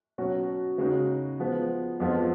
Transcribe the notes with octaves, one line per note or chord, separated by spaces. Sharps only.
B2 F#3 C#4 F#4
C#3 G#3 D#4 F#4
F3 G#3 B3
F2 F3 G#3 B3 F4